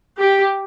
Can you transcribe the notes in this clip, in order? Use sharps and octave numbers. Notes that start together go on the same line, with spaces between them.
G4